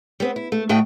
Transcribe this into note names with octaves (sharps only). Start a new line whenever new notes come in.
G3 B3 C4
E4
A3
A2 A3 F#4 D#5 G5